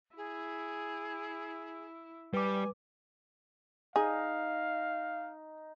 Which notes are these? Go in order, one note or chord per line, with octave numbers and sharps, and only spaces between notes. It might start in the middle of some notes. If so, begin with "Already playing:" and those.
E4 G#4
G3 B4 G#5 D6
D#4 G#4 F5